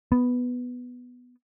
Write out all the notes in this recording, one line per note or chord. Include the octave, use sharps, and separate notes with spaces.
B3